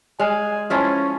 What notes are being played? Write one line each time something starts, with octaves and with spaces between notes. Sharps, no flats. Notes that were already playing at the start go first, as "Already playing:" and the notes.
G#3 F5 G#5
F3 C#4 E4 F4